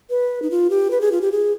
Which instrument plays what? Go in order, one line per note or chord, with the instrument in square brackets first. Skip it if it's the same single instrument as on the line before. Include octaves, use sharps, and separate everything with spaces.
[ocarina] B4
D#4
F4
G4
B4
G#4
F4
G4
G#4